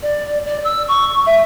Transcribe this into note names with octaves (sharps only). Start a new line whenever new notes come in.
D5
D5
E6
C#6
E5